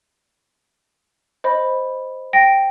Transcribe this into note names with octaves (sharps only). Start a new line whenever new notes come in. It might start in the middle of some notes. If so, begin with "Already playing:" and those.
C5 D#5 B5
G5 A#6 D7